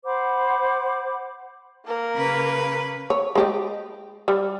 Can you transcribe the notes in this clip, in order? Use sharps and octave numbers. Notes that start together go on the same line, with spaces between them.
C5 F#5 B5 D6
A#3 A#4
C#3 B4
C#5
G#3 G4 D#5
G3